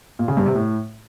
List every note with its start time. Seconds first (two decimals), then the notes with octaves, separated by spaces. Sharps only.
0.19 A#2
0.28 C#3
0.37 G2
0.46 C3
0.55 A2